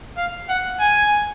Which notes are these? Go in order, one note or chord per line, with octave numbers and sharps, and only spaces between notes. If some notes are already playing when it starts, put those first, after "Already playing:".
F5
F#5
G#5